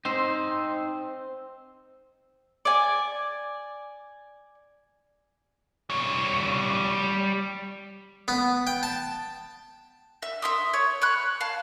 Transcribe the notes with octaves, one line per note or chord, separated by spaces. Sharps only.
C4 D#4 C5
D5 G#5
G3 C#5
B3
G5
A5
E5
E5 C6 D#6
C#5
C#5 B5 F#6
F5 A5